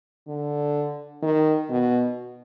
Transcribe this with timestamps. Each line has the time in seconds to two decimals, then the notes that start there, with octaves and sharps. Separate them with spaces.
0.28 D3
1.22 D#3
1.70 B2